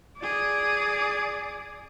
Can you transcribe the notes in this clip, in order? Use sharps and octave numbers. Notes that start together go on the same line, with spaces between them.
G#4 D5